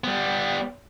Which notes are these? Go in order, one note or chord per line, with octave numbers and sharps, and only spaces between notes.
G3 B3